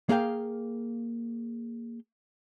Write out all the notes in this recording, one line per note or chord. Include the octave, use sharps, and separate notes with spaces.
A#3 G#4 F5 G5